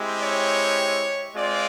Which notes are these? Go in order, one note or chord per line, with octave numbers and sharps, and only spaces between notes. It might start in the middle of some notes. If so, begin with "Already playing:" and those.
Already playing: G#3 C4 E4 G4
C#5
G#3 C4 F4 D5